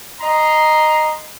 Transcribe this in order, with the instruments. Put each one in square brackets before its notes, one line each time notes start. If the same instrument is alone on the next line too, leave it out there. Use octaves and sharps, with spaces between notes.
[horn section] D#5 A#5 C6